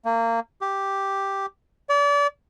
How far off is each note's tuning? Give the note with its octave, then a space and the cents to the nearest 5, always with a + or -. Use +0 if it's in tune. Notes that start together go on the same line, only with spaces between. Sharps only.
A#3 -25
G4 +0
D5 -35